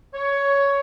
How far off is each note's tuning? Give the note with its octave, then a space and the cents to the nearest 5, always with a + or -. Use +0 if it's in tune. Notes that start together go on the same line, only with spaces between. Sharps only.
C#5 +10